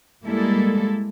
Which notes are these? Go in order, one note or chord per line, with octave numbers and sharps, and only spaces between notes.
G3 G#3 A#3 E4 A4